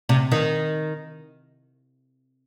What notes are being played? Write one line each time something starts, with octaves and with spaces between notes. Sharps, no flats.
C3
D#3